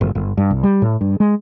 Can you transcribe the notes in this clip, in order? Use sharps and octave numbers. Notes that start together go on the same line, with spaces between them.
G1
G1
G2
C2
G3
A2
G2
G#3